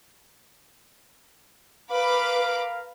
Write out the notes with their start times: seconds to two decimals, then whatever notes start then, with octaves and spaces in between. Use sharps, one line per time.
1.91 A#4 B4 F5 B5 D6